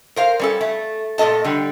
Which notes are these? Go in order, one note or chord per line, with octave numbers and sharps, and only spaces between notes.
A#4 C5 F5
G3 C#4 A4
A3
A#2 A3 A4 D#5 A5
D3 G3